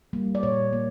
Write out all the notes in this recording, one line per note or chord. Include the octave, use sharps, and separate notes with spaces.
G3 A#3
D5
A#2 C#5
A#3